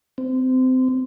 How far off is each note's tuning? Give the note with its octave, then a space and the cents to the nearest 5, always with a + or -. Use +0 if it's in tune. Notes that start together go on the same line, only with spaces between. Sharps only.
C4 -25